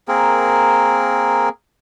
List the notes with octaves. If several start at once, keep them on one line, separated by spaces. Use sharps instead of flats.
A#3 C4 G#4 A#4